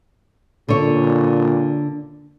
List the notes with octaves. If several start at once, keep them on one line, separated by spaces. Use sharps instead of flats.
A#2 D3 C#5